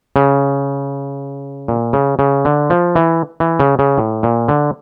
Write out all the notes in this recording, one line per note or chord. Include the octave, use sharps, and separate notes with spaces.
C#3
A#2
C#3
C#3
D3
F3
E3
E3
C#3
C#3
A2
A#2
D3